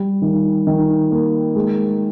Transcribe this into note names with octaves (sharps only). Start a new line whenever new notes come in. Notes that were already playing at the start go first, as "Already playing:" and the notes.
Already playing: G3
D#3
D#3
A#3
G#3